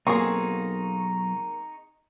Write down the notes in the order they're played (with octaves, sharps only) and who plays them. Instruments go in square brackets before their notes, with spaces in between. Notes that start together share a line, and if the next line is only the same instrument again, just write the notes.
[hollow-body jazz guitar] B1 [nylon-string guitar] A#3 F#4 F5 [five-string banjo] C4 G#4 [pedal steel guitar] D#4 C#6